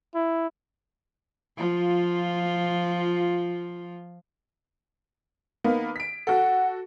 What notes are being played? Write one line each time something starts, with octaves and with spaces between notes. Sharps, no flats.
E4
F3 F4
D#3 A#3 B3
B6 D7
F#4 A4 F#5